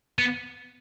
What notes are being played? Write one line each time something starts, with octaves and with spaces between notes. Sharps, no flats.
B3